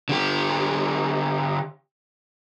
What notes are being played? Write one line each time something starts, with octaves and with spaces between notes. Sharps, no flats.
D3 G4